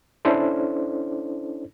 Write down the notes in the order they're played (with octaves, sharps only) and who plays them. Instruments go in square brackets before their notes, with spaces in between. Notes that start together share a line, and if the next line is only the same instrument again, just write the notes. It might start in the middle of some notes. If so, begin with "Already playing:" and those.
[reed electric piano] C#4 D4 E4 A4 C5 D5